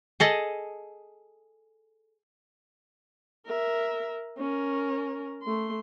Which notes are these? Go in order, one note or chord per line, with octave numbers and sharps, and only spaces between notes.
G#4 A4 D#5
A#4 E5
C#4 A#4
A3 C6